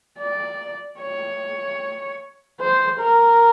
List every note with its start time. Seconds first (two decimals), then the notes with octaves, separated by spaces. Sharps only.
0.18 D5
1.00 C#5
2.60 C5
3.00 A#4